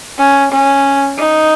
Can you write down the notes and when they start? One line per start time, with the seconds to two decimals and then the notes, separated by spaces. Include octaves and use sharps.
0.18 C#4
0.52 C#4
1.18 D#4